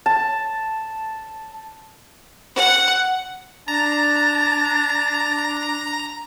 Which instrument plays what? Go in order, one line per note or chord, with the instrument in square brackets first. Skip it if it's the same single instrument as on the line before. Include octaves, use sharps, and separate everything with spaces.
[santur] A5
[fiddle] F#5
[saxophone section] D4 [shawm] A5 [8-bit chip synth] A#5